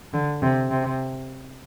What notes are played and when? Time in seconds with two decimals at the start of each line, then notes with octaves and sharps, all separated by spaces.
0.13 D3
0.42 C3
0.70 C3